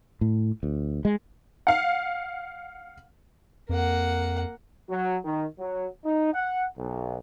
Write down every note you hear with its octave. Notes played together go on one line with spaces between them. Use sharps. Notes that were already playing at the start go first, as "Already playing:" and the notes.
A2
D2
G#3
F5 F#5
F2 A#3 F#5
F#3
D#3
F#3
D#4
F#5
B1